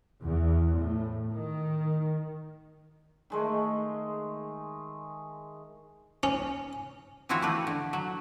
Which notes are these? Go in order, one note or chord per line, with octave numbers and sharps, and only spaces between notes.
E2
A2
D#3
D#3 G#3 A3
C#4
E3 F3 C4 E4 F#4 C#5
A3 G4 B4
D3
F#3